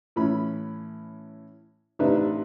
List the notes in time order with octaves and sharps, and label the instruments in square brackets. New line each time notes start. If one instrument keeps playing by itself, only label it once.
[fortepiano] A2 E3 C#4 B5
A1 C3 D4 D#4 B4 E5